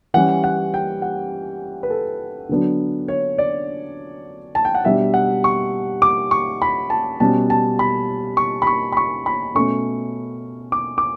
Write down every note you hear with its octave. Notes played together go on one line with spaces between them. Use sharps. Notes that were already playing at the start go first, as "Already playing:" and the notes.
E3 G3 C#4 F#5
F#5
G5
F#5
B4
A4
D3 F#3 B3 D4
C#5
D5
A5
G5
F#5
B2 G3 D4 E5
F#5
C#6
D6
C#6
B5
A5
B2 G3 C#4 A5
A5
B5
C#6
B5
C#6
B5
C#6
B5
B2 A3 C#4 C#6
D6
D6